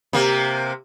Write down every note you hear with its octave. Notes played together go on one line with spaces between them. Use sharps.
C3 A#3